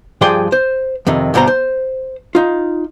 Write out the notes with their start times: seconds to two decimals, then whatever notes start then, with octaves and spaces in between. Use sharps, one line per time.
0.21 G2 F3 G#4 D5 G5 C6
0.52 C5
1.07 F2 C3 D#3
1.34 D2 G2 B2 C5 A#5 C6
1.47 C5
2.35 D#4 F4